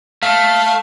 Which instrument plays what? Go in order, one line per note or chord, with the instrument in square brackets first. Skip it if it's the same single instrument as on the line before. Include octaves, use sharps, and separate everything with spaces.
[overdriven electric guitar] A3 [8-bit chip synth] F5